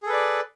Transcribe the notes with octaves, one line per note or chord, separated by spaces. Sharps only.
G#4 A4 B4 D5